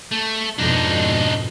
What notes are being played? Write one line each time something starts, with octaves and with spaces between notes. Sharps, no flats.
A3
F2 G#2 B2 D4 D#4